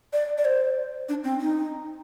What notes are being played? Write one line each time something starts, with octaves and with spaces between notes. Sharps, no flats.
D5
D5
C5
D4
C4
D#4